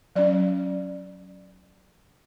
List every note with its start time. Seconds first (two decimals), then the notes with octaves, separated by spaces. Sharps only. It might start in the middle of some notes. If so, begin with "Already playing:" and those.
0.16 F#3 C#4 D5